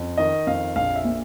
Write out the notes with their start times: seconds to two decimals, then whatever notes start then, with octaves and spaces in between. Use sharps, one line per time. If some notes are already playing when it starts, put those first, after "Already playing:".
Already playing: F2
0.18 D#3 D#5
0.47 F2 F5
0.76 A#1 F5
0.96 E5
1.04 A#2